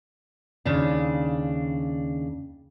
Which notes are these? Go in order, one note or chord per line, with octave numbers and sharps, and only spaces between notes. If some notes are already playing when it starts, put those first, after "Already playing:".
D#2 C#3 D4